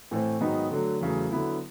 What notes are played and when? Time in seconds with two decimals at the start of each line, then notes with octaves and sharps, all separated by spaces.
0.11 A2 E3 A3 C4
0.41 G#2 D#3 F#3 B3 D#4
0.71 D3 F#3 A3
1.01 E2 C#3 F#3 A3
1.31 D3 F#3 B3 E4